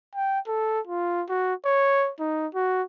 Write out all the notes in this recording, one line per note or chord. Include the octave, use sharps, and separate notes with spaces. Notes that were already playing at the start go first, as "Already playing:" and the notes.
G5
A4
F4
F#4
C#5
D#4
F#4